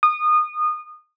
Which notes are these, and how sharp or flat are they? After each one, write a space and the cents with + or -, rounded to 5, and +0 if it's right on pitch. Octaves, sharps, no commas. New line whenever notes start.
D#6 -25